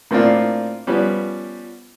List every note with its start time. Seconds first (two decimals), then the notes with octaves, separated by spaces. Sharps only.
0.11 A2 A#3 C4 D4 F4
0.87 F3 G3 B3 C#4